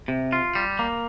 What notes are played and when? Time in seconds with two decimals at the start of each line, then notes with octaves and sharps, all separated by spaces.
0.08 C3
0.32 F4
0.55 G3
0.79 A#3